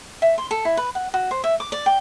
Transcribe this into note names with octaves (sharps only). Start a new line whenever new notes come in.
E5
C6
A4
E4
B4
F#5
F#4
C5
E5
D6
D5
G5